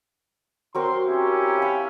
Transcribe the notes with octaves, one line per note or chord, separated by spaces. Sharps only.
F#3 C4 A#4 C6
C#4 E4 G4
F5 B5